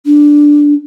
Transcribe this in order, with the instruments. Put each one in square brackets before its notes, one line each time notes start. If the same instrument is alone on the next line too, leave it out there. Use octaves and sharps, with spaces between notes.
[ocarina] D4